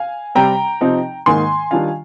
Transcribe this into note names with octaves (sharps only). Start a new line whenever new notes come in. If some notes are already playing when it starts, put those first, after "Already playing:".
Already playing: F5 G#5
C3 G3 C4 G5 A#5
C3 F3 C4 D#4
G#2 D#3 A#3 G#5 C6
D#3 G3 D4 F4 F5 G#5